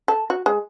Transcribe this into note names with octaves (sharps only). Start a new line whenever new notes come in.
A4
F#4
G#3